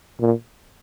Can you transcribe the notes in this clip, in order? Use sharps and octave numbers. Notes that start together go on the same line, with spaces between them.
A#2